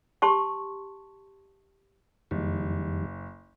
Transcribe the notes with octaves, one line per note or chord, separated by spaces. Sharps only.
G4 A5 C6 C#6
F#1 F2 D#3 G3